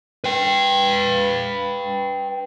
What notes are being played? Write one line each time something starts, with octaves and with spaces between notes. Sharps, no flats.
B4 G5